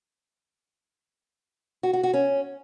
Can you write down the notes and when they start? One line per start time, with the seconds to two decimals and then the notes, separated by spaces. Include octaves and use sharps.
1.83 F#4
1.93 F#4
2.03 F#4
2.13 C#4